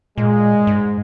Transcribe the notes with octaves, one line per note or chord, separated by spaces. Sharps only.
A#2 G#3
G#2